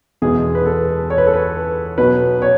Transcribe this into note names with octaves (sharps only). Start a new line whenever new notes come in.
E2 B2 G#3 G#4
B4
A4
C#5
B4
A4
B4
B2 F#3 B4
C#5